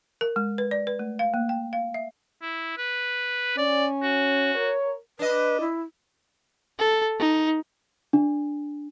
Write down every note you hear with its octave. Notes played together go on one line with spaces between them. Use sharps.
A#4
G#3
B4
D5
B4
A3
F5
A#3
G5
F5
E5
E4
B4
C#4 D5
F#4
A#4 C#5
D4 B4 D#5
E4
A4
D#4
D4